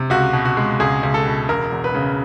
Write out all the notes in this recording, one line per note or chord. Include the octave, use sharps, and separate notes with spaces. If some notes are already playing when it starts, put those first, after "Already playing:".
Already playing: C3
C#2 F#4
B2
F#4
G#3
C#2 G#4
C#2
A4
B2
E1 A#4
E2
B4
C#3